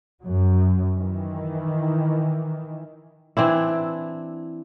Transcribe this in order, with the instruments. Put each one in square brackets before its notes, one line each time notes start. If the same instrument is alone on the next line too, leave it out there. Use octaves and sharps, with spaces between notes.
[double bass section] F#2 F#3
D#3 E3
[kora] E3 C4 D4 E4